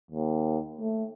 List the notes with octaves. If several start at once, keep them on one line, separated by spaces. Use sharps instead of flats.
D#2
A3